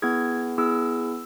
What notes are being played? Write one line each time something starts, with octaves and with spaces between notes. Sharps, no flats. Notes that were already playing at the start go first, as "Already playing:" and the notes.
B3 E4 G#4 G#6
B3 E4 G#4 E6